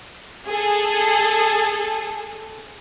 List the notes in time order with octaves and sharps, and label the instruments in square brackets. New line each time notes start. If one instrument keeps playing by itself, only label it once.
[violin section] G#4 A4